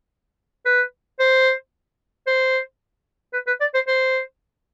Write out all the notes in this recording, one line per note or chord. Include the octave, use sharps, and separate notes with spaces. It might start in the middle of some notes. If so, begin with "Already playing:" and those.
B4
C5
C5
B4
B4
D5
C5
C5